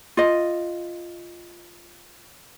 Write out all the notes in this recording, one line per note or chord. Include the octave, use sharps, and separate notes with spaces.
F4 D#5